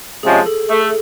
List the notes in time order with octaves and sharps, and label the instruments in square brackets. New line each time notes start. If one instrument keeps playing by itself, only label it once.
[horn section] C3 F3 G#3 C#4 [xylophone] G#4
[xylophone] A4
[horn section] A3 [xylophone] G#4
[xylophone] A4